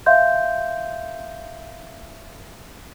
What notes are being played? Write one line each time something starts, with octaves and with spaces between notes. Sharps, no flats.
E5 F5 C6 G6